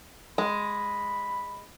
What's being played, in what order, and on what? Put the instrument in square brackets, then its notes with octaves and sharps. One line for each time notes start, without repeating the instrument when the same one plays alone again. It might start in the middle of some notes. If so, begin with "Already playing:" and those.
[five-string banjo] G#3 [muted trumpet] B5